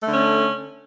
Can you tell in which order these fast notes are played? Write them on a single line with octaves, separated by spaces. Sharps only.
A3 D3 C#4